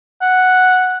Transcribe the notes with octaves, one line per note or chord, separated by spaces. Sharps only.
F#5